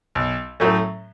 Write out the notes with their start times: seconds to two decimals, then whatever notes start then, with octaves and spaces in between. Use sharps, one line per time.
0.15 B1
0.60 A2 F#3 A3 C#4